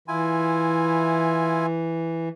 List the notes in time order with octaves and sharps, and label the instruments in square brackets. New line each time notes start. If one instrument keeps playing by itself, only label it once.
[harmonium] E3 [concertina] E4 F4 G#5